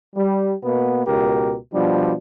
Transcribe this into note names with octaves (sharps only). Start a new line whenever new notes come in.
G3
B2 A#3 B3
C#2 B2 G4 A#4
B2 F3 G3 D4